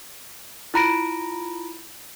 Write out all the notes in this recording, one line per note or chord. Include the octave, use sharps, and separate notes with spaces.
E4 F4 A#5 B5 A#6 D7